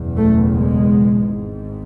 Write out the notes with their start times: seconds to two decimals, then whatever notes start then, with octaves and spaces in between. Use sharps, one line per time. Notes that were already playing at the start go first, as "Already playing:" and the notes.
Already playing: F#1 E2 B2
0.17 A3
0.55 G#3
1.27 G#1 G#2